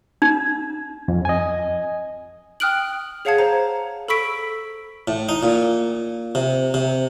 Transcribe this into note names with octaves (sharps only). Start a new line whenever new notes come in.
D#4
F2
D#5 G#5
G5 D#6 F6 F#6 D7 F#7
G#4 C#5 F5 F#5 A5 G#6
C5 A#5
A4 B5 C#6 E6 B6 D7
A2
D#4
A#2
C3
C3